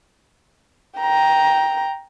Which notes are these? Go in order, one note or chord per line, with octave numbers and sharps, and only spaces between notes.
G5 A#5